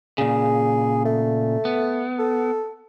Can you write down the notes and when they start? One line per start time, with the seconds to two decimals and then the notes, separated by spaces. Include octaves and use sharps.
0.18 A#2 C#3 G#4
1.05 A3
1.65 B3
2.19 A4